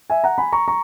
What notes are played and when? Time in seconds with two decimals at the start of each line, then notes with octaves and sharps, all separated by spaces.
0.10 E5 G#5
0.24 F#5 A#5
0.38 G#5 B5
0.52 A#5 C#6
0.68 A#5 C#6